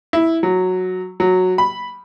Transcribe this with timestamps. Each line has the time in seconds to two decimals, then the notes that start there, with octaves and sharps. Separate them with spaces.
0.13 E4
0.43 F#3
1.20 F#3
1.58 B5